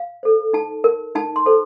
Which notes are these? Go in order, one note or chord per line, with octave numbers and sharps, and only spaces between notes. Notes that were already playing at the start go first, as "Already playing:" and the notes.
Already playing: F5
A4 C5
D#4 A5
A#4
D#4 A5
C6
A4 C5